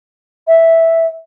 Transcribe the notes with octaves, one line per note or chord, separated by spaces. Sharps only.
E5